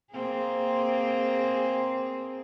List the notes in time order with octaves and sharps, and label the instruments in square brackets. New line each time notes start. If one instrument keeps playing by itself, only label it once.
[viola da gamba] A#3 C4 G#4